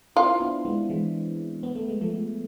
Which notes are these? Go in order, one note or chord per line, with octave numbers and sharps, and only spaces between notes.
C4 E4 F4
B3 D4
G#3 B3
E3 G#3
B3
A3
G#3
F3 A3